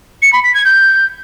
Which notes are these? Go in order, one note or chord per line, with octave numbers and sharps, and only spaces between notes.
C#7
B5
B6
G#6
G6